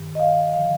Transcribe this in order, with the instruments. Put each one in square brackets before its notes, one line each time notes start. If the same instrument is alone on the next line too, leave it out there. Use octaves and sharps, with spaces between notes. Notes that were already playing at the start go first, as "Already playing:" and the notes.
Already playing: [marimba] G2 D#3
D#5
F5
D3 F3 F5